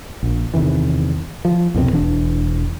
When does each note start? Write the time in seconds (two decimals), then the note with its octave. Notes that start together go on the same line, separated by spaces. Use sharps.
0.23 A#1
0.54 E2 C3 D#3 E3
1.45 F3
1.74 C2 F2 B2 C4
1.91 E1 E3 D4